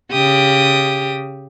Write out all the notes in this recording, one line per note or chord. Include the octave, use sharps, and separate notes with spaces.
C#3 G4 D#6